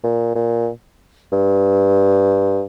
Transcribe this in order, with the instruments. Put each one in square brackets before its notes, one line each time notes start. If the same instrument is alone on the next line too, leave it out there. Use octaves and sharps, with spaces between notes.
[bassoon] A#2
A#2
G2